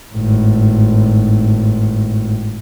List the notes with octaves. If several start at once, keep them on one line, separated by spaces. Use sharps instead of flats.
G#1 A2